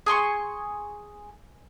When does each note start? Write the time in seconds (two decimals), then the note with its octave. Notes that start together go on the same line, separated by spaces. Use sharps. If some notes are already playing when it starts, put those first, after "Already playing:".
0.06 G#4 G#5 C6 C#6